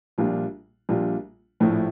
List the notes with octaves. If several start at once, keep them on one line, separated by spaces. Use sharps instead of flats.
A#1 A#2 G3 D4 F4
A#1 A#2 G3 D4 F4
A#1 A2 F3 A3 E4